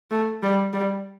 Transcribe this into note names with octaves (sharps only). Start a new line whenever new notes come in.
A3
G3
G3